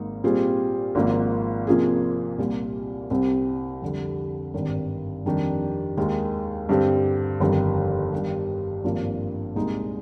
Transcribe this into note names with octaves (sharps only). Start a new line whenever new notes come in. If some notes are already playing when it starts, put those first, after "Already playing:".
Already playing: G#1 G#2 A#3 D#4
A#2 G3 C4 F4 G#4
G#1 G#2 F3 A#3 F4
C3 F3 A#3 F4 G#4
C2 A#2 G3
C2 C3 G3 C4
F2 D3 G3
G#1 G2 D#3
F2 D#3 G3 D4 G4
D#2 D#3 G#3
G2 D3 G3 C4 G4
G1 F2 D#3 G3
G2 D#3 G3
G#1 G2 F3 A#3 D4
C2 A#2 G#3 D#4